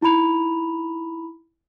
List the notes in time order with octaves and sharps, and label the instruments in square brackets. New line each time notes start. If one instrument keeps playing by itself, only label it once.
[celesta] D#4 E4 A#5 B5 F7